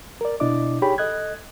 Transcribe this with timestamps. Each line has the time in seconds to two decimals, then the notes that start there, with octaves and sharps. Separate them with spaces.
0.21 A#4 D5
0.40 B2 D4 E4 D5 D#5 D6
0.82 D#4 G4 G#4 C#5 G5 B5
0.98 A4 D#5 F#6 G#6